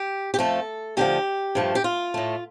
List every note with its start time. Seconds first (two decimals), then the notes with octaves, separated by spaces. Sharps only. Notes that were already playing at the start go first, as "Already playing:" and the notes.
Already playing: G4
0.34 G4
0.38 F2 F3 A3 A4
0.97 D2 D3 F3 G4
1.55 G2 F3 A3
1.75 G4
1.84 F4
2.14 A2 A3